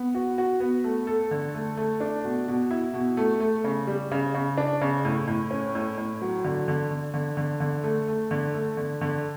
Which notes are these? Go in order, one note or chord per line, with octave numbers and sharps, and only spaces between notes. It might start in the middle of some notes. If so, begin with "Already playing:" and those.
Already playing: B3
F#4
F#4
B3
A3
A4
D3
A3
A3
D4
B2
B2
E4
B2
A3
A3
C#3
G3
C#3
C#3
D4
C#3
A2
A2
C#4
A2
A2
F#3
D3
D3
D3
D3
D3
D3
A3
A3
D3
A3
D3
D3